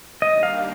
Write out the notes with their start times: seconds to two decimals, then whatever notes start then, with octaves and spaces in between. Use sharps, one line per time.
0.22 D#3 G3 A#3 D4 G4 D#5
0.43 F5